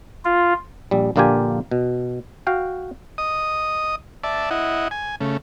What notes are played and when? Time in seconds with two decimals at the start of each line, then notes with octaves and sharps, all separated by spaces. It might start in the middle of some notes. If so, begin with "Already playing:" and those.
0.25 F4
0.91 A#1 G3
1.16 A#1 D3 A#3 F4 G4 G#5
1.71 B2
2.47 F#4 F5 G5
3.18 D#5 D#6
4.24 D5 E5 A5
4.51 E4 D#5 F#5
4.91 G#5
5.21 C#3 A3